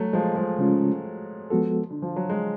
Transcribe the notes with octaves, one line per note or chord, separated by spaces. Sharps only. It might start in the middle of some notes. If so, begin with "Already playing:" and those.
Already playing: F#3 A3
F3 G#3
F3 G#3
C#3 G#3 C#4 F4
F3 G#3 B3 F#4 A4
D3
F3
F#3
G#3